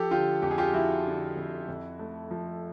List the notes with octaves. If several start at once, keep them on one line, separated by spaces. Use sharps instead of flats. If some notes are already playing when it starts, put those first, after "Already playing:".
Already playing: F3 G4 A4
D3 F4 G4
F2 G4
G#4
F4 G4
F3 E4 F#4
D3
F2
F2
A3
F3